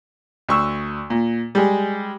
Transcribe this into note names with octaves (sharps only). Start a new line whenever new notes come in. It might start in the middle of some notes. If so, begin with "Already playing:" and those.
D2 C#6 E6
A#2
G3 G#3